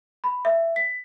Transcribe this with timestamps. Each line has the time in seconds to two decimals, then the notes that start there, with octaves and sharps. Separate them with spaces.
0.24 B5
0.45 E5
0.76 B6